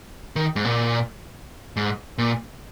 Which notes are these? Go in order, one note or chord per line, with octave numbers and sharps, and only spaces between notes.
D#3
G#2
A#2
G#2
A#2